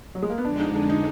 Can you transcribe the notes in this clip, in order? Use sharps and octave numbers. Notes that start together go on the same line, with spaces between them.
F#3
G#3
A#3
B3
F2 D3 G#3 D4
D#4
D4
D#4